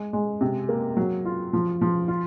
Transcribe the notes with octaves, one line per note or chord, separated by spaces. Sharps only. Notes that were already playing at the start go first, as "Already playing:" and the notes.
Already playing: G#3
G#3
C3
A#3
F#3
F4
F3
F3
F4